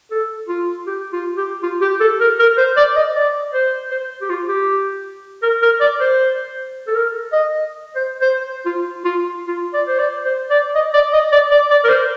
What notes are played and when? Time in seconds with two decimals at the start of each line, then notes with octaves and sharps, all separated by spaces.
0.11 A4
0.49 F4
0.87 G4
1.13 F4
1.37 G4
1.63 F4
1.81 G4
2.00 A4
2.20 A#4
2.39 A#4
2.57 C5
2.77 D5
2.96 D#5
3.16 D5
3.53 C5
3.91 C5
4.22 G4
4.29 F4
4.48 G4
5.43 A#4
5.62 A#4
5.80 D5
6.00 C5
6.87 A4
6.95 A#4
7.32 D#5
7.96 C5
8.21 C5
8.66 F4
9.05 F4
9.48 F4
9.74 D5
9.88 C5
9.99 D5
10.25 C5
10.50 D5
10.75 D#5
10.94 D5
11.13 D#5
11.33 D5
11.51 D5
11.70 D5
11.84 A#4
11.89 C5